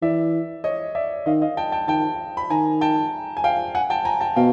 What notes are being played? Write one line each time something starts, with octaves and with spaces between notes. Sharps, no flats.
E3 D5 E5
C#5 D#5
D5 E5
D#3 D#5 F5
D#5 F5
G5 A5
G5 A5
D#3 G5 A5
B5
D#3 G#5 A#5
G5 A5
G#5
F5 G5
F#5 G#5
G5 A5
G#5 A#5
G5 A5
B2 F5 G5